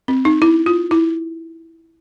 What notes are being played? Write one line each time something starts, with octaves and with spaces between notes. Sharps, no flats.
C4
D#4
E4
F4
E4